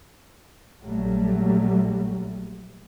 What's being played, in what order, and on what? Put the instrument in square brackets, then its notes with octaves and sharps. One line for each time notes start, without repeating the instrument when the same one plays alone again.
[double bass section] A#1 F#3 G3 A3